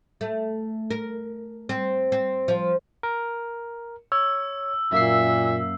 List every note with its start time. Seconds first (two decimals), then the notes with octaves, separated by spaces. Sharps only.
0.21 A3
0.91 A#4
1.69 C4
2.12 C4
2.48 F3
3.03 A#4
4.12 C#5 E6
4.92 F#2 A#2 A#3 E5 C7